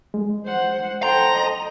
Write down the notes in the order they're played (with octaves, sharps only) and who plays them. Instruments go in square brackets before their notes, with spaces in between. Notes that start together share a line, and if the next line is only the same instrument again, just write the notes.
[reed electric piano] G#3
[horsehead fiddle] C5 F#5
[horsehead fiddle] A4 G5 [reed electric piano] C5 C6 [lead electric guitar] A#5
[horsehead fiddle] D#5